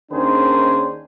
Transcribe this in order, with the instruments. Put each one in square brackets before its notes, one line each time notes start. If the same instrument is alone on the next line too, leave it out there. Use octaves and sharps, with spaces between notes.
[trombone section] D#2 D#3 C#4 D4 G#4 C5